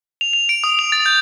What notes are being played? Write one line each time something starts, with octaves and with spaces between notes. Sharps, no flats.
F7
F7
D7
D#6
F7
A6
G6